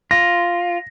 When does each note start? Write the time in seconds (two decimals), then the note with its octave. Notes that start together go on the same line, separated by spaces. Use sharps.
0.11 F4 A#6